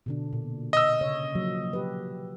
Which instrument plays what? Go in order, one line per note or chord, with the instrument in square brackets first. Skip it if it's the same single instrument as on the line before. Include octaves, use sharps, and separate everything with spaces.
[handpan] B2 D3 D4
A#2
[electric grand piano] D#5 E6
[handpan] C#3 C#5
F3 F#3 A#3
G4 B4